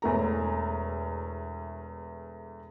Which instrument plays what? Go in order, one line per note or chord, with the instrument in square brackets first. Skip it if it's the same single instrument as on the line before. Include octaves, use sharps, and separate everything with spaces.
[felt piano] E1 E2 A3 A#5